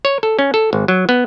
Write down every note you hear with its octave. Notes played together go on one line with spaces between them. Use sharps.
C#5
A4
C#4
A4
G#1
F#3
B3